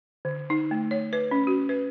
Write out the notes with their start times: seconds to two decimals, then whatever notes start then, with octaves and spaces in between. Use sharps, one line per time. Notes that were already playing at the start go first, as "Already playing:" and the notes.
0.25 D3
0.50 D#4
0.71 A3
0.91 C#5
1.13 B4
1.31 C#4
1.47 F#4
1.69 B4